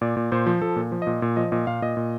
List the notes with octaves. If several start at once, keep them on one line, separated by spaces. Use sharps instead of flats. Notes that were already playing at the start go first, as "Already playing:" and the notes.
A#2 D5
A#2
A#2 C5
F3
F3 A4
A#2
F3
A#2 D#5
A#2
F3 D#5
A#2 D#5
A#2 F5
A#2 D#5
A#2